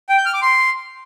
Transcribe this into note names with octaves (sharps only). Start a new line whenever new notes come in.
G5
G6
F6
D6
C6